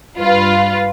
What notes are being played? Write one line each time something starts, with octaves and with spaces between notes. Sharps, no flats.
G2 F4 B4